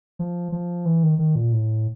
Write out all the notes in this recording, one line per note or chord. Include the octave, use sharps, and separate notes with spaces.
F3
F3
E3
D#3
D#3
A#2
A2